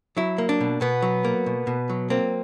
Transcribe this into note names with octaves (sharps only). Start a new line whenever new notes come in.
F#3 E4
A#3
D4
B2
B2 B3
F#3
A#3
B2
B2
F#3
A#3 C4